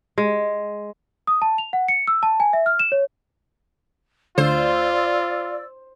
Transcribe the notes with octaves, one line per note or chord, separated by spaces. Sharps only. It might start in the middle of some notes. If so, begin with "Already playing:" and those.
G#3
D#6
A5
F7
F#5
C#7
E6
A5
G#5
E5
F6
E7
C#5
D2 F4 C5 D5 E6